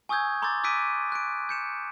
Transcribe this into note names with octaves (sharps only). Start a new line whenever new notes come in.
G#5 C#6 D#6 E6 G6 G#6
A#5 C6 D6 E6 G6 A6
D6 E6 F#6 B6 D7 D#7
F#6 D7
G6 C#7 E7